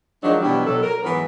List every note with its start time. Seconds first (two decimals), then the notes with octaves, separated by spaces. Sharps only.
0.23 D#3 F3 F#3 G#3 D4 D#4
0.42 B2 E3 F#3 G3 D4 E4
0.66 B2 F#3 A4
0.83 A#4
1.03 G#2 E3 F#3 B3